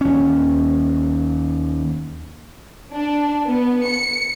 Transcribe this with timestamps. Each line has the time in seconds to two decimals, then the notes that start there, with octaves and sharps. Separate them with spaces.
0.01 D#2 C#4
2.94 D4
3.46 B3
3.85 C#7